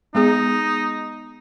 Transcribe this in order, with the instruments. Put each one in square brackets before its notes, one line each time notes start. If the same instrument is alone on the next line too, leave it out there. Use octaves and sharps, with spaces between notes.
[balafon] G#3 B3 G#4 [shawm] D#4